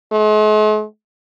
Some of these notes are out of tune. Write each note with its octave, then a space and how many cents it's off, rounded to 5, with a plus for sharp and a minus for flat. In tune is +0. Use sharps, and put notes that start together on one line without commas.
G#3 +45